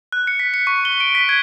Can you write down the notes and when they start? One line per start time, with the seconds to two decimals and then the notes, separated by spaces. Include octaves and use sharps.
0.12 F#6
0.27 C#7
0.40 B6
0.54 C#7
0.67 C#6
0.85 G7
1.00 D7
1.15 B6
1.29 G#6